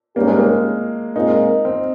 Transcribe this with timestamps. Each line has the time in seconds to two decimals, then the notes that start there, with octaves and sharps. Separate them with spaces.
0.16 G#2 G3 A#3 C#4 G4 A#4
0.27 G#3
0.38 A#3
1.15 A#2 G#3 C4 D#4 F4 A#4
1.65 C4